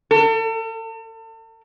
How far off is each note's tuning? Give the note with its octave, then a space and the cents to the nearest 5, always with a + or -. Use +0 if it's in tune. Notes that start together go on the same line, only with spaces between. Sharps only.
A4 +40